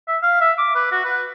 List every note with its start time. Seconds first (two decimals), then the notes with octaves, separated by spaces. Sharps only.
0.08 E5
0.23 F5
0.41 E5
0.58 D6
0.75 B4
0.91 F#4
1.05 B4